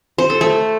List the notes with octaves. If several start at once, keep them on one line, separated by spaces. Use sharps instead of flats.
C5
A4
A3